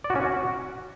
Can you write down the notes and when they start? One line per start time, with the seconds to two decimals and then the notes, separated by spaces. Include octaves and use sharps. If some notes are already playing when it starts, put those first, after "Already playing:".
0.04 D5
0.10 F#4
0.16 C#4
0.21 F#4